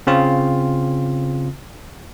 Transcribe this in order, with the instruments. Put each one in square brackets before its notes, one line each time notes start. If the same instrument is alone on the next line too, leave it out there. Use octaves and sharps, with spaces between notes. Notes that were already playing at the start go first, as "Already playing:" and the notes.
[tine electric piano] C#3 C4 F4